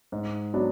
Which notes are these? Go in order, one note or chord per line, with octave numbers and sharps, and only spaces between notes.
G#2
F#3 B3 D4